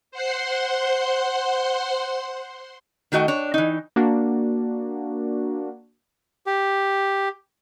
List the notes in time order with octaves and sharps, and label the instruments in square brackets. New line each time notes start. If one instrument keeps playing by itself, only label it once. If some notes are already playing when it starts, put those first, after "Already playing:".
[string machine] C5 F#5 C6
[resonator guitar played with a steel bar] D#3 A3 F#4 D#5 G5
D4 C#5
E3 D#4
[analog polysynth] A#3 D4 F#4
[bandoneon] G4